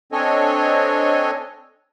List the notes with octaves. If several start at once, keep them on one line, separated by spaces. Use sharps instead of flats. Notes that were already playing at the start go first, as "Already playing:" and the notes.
C4 D4 A4 C#5 D#5 G#5